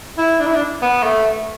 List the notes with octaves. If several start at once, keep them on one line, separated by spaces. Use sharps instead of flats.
E4
D4
E4
D4
B3
A3